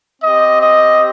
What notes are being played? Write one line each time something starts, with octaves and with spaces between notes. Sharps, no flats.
C4 G4 D#5
D#5